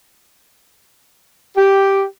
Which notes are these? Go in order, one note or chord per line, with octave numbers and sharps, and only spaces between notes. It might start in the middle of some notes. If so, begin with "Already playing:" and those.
G4